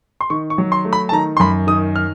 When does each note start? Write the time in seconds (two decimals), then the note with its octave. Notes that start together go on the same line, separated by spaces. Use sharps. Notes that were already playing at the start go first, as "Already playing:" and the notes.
0.21 C6
0.30 D#3 C#6
0.50 C#6
0.58 F#3
0.72 C6
0.85 A3
0.93 B5
1.09 A5
1.12 D#3 A#5
1.37 C6
1.40 F#2 B5
1.67 D#3 D#6
1.96 F6